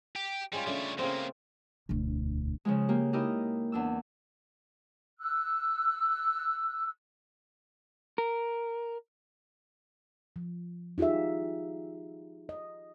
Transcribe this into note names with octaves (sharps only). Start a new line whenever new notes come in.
G4
G3 G#3 C#4 F4
C#3 G3 A3 D4 C#5
A2 C#3 A#3 C4
E1 D2
C#3 F3 G#3
A#3 G4
D#4 E4 G4 A#4 D#5
E2 D4 E6
E6 F#6
A#4
F3
D#4 F4 G4 G#4 E5
D#5